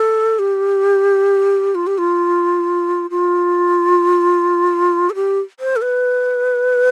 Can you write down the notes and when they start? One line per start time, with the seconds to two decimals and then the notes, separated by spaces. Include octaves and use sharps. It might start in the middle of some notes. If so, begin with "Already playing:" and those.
Already playing: A4
0.39 G4
1.75 F4
1.87 G4
1.98 F4
3.10 F4
5.10 A4
5.15 G4
5.60 C5
5.76 A4
5.82 B4